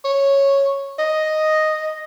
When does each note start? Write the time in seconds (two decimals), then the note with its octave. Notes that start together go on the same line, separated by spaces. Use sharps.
0.04 C#5
0.98 D#5